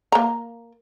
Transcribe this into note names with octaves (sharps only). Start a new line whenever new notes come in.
A#3 A#5